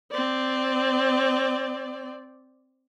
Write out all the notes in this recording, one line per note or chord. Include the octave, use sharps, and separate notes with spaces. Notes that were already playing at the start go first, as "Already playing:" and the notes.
C4 D5